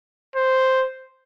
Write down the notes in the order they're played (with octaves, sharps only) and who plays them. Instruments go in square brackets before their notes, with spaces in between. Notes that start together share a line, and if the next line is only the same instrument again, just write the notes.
[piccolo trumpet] C5